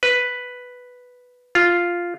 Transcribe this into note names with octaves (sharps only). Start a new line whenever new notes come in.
B4
F4